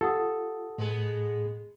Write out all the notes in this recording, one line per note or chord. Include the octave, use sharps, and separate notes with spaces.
F4 G4 A4 F#5 D#6
A2 G#3 B3 G#4